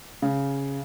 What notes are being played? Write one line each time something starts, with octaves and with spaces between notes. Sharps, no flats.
C#3